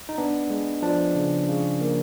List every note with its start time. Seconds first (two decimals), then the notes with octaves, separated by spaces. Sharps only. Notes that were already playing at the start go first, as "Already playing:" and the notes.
0.09 D#4
0.18 B3 D4
0.50 G#3
0.82 F3 D4
1.15 C#3
1.48 C#3
1.81 A#3